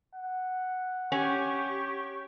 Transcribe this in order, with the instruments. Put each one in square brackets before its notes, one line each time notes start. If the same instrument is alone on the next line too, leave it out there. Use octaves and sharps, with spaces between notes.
[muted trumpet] F#5
[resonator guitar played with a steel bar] C#4 [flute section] G4 C#6